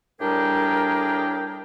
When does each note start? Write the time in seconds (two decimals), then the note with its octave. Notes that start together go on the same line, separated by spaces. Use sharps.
0.20 A2 G3 D4 G4 G#4 A#4